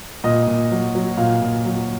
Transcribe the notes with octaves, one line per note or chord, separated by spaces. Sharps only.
A#2 D#5
A#2
F#3
F#3
A#2 F5
A#2
F#3